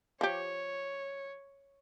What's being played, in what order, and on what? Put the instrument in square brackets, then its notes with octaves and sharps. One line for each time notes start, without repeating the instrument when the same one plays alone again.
[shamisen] F3 G4 [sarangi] C#5